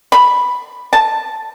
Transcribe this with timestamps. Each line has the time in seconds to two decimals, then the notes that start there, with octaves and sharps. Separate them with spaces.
0.12 B5
0.93 A5